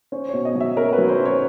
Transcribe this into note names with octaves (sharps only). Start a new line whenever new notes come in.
C#4 C5
B2 C#5
D#5
F#3
E5
C#4 A#4
B4
F#3
C5
C#4
C#5